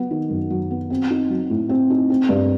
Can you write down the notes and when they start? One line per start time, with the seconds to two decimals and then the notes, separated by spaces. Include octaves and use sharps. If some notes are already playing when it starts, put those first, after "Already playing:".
Already playing: F#3 B3
0.11 D#3
0.30 F#2
0.50 F#3
0.71 B3
0.90 C4
1.10 D#4
1.30 F#3
1.50 A2
1.69 C4
1.90 D#4
2.10 C4
2.29 G2